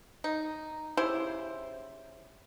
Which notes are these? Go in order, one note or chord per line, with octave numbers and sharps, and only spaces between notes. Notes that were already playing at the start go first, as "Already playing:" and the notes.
D#4
C#3 E4 G4 C5